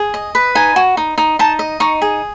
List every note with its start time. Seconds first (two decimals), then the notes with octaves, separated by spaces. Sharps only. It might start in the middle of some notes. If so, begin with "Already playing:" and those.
Already playing: G#4
0.14 D#5
0.35 B4
0.55 D#4 G#5
0.76 F#4
0.97 D#4
1.18 D#4
1.39 D#4 A5
1.59 D#5
1.80 D#4 C#6
2.02 G#4